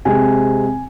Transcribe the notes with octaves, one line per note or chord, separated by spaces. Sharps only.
C3 G#3 C4 G#5